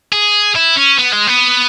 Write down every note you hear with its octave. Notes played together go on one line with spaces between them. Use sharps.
G#4
E4
C#4
B3
G#3
B3